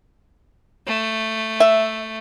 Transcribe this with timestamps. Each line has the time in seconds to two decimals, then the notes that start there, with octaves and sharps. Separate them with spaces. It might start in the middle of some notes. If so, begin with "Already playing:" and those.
0.87 A3
1.60 E5